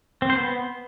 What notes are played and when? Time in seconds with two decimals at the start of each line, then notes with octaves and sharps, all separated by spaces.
0.22 C4
0.30 C5
0.37 B3